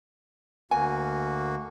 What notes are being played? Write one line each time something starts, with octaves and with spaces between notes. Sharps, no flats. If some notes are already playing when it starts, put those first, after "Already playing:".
D2 A#3 F#4 G#5